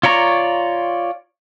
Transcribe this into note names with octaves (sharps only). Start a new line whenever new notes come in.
F4 C#5 D5 A#5 C#6